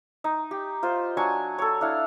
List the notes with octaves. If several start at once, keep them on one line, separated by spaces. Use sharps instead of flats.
D#4
G4
F4 C5
F#3 D4 G#5 C#6
A4 C#5
D4 E4 F5